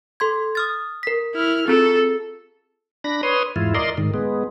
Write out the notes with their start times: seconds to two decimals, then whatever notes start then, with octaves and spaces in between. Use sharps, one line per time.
0.20 A4 C6 G#6
0.55 D#6 F6 A6
1.03 A#4 B6
1.35 E4 F6
1.68 C4 F4 G#4 A4
3.04 D4 B5 A#6
3.23 B4 C#5 C6 D#6
3.56 E2 G#2 E4 F4
3.75 A#4 D5 D#5 C6
3.98 G#2 D#3
4.14 G#3 B3